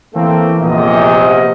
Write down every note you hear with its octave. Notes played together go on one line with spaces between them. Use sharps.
E3 A3 A#3 C4
A#1 E2 C3 D#5